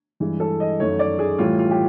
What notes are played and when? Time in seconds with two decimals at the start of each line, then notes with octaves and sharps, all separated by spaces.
0.20 G2 E3 G#3
0.40 A4
0.60 D#5
0.80 F#2 D#3 F#3 A3 C#5
0.99 D5
1.19 G#4
1.38 A2 E3 G3 F4
1.59 F4
1.71 G4